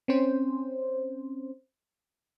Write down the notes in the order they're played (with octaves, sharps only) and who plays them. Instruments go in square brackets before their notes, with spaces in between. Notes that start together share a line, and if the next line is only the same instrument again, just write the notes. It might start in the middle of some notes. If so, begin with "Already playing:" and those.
[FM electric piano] C4 C#4 C5